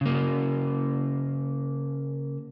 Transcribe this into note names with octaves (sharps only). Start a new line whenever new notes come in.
C#3 A#3